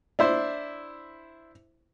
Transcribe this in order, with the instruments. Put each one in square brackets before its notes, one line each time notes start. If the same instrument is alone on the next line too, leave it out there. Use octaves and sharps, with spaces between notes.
[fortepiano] D4 E4 C5